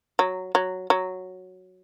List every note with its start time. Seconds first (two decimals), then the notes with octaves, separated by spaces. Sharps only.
0.19 F#3
0.55 F#3
0.90 F#3